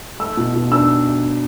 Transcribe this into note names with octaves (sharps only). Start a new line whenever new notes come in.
A3 E6
B2
B2
D4 E6